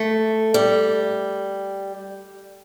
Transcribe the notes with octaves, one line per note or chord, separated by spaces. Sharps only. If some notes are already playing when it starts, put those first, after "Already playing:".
Already playing: A3
G3